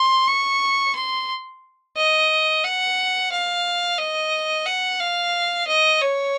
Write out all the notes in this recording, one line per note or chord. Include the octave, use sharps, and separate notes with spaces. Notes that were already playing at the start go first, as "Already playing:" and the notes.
Already playing: C6
C#6
C6
D#5
F#5
F5
D#5
F#5
F5
D#5
C#5